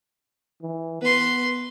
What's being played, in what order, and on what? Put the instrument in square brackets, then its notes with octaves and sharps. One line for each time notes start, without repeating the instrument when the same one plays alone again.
[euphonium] E3
[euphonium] B3 [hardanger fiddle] B4 C6